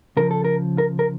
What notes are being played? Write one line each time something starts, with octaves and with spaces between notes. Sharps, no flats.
C#3 F3 A#4
A4
A#4
A#4
A#4